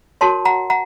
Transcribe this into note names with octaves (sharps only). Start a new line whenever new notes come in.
F#4 A#4 C#5 A5 C6
F#5 A#5
F#5 A#5